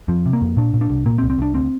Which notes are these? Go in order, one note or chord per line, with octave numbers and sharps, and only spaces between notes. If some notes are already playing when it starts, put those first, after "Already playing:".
F2 F3
C3
A#3
F2
A#2 D4
A#2
D4
C2
A#2 A#3
C4
C2
C4
C2 D4
D2 C4